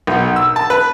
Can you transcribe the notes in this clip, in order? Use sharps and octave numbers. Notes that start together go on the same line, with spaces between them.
B1
E6
A5
B4